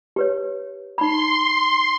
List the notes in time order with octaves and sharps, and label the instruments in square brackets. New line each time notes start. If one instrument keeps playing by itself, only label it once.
[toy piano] G4 B4 C#5
[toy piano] D#4 B5 [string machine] C6